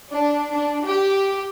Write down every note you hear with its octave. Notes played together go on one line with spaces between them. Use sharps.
D4
D4
G4